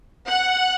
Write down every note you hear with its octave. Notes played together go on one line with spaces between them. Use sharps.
F#5